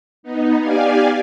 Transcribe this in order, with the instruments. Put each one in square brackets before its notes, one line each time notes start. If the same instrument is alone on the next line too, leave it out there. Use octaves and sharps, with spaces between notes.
[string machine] B3 D#4
G4 D5 F5 G#5